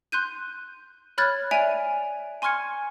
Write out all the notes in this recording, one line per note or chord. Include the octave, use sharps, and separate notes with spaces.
C6 F#6 G6 D#7
C#5 B5 F6 F#6 G#6 A6
D5 E5 G#5 D7 D#7 F7
G#5 C6 C#6 F6 G#6 C#7